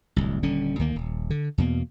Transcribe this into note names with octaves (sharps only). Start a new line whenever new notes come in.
D1 C2
D#1 D3 G3 C#4
D2 D#3 A#3
D#1
D3
E2 B2 A#3